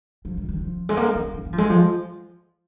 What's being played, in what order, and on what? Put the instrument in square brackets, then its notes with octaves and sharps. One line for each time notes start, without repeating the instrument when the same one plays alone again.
[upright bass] F3
D#3
D#3
F3
G#3
A#3
D#4
C#4
A#3
F3
G#3
F3